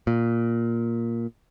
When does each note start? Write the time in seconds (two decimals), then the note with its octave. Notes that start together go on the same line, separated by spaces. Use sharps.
0.07 A#2